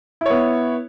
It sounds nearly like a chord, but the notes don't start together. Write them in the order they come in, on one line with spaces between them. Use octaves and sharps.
E4 C#5 B3